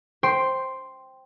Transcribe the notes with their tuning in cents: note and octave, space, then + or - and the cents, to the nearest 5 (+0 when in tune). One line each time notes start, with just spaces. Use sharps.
C5 +10 G5 +0 C6 +0